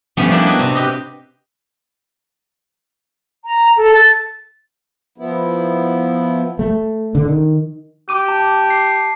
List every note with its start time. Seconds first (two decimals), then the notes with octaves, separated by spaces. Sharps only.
0.17 F3 G3 A3 B3 C#4 D4
0.31 A#3 B3 D4 E4 G4 A#4
0.46 B3 F#4 B4 D#5
0.59 C3
0.75 G4 B4 D#5
3.45 A#5
3.77 A4
3.95 A6
5.18 F3 B3 E4
6.59 A3
7.15 D3
7.28 D#3
8.09 G4 D6 D#7
8.28 A5
8.70 C7